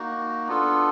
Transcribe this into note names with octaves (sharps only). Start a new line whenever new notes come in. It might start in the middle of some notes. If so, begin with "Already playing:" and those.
Already playing: A#3 D#4 F#4
B3 D4 F4 A4